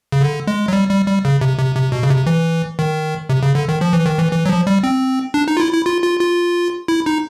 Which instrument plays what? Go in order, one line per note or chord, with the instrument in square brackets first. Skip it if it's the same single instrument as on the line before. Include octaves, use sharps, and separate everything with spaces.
[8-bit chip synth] C#3
D3
G#3
F#3
G3
G3
G3
C#3
C3
C3
C3
B2
C#3
C3
E3
D#3
C3
C#3
D3
D#3
F3
E3
D#3
E3
E3
F#3
F3
G3
C4
D4
D#4
F4
E4
E4
F4
F4
F4
E4
D#4